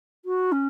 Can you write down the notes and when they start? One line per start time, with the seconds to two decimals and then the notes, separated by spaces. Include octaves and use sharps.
0.25 F#4
0.52 C#4